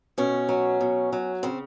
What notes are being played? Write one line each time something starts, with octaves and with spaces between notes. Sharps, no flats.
B2 C#4
F#3
B2
F#3
C#3 C4